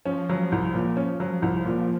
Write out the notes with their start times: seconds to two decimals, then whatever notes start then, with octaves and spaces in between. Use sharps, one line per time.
0.05 F3 C#4
0.29 F#3
0.52 C2
0.74 A#2
0.97 C#4
1.20 F#3
1.42 C2
1.65 A#2